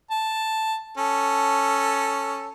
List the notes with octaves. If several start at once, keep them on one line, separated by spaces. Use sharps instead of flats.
A5
C#4 A4